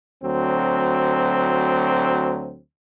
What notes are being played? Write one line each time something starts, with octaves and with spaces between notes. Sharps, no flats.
D2 F#3 C4